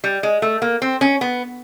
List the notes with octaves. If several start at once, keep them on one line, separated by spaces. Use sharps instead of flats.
G3
G#3
A3
A#3
C4
C#4
B3